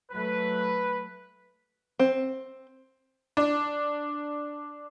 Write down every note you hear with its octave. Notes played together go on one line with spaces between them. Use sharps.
F#3 A3 B4
C4
D4